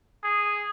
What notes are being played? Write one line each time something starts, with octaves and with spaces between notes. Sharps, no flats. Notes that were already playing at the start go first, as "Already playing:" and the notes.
G#4